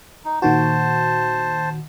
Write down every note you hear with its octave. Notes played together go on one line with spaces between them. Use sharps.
D#4
A#2 D#3 F#4 C5 A5